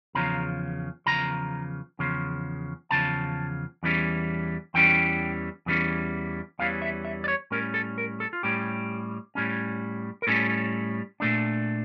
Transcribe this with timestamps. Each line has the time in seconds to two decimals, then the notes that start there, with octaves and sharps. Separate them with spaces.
0.15 E2 C#3 F3 A#5
1.06 E2 C#3 F3 A#5
1.99 E2 C#3 F3
2.91 E2 C#3 F3 A5
3.83 E2 E3 G3 C#4
4.74 E2 E3 G3 C#4 G5
5.66 E2 E3 G3 C#4
6.59 E2 E3 G3 C#4 F5
6.82 E5
7.05 E5
7.24 D5
7.28 C#5
7.51 A2 G3 C#4 A#4
7.74 A4
7.98 A#4
8.20 A4
8.33 F4
8.43 A2 G3 C#4 G4
9.35 A2 G3 C#4
10.22 A#4
10.27 A2 G3 C#4 A4
11.20 A#2 A3 D4